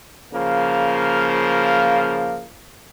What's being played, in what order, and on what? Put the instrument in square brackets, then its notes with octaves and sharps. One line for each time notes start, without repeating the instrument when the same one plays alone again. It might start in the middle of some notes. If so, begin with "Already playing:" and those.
[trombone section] C#3 F3 A#3